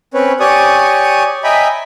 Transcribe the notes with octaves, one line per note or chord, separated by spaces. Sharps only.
C4 C#4 B4 C#5
G4 C#5 D5 G#5 C#6 D#6
D#5 E5 G5 G#5 A#5 B5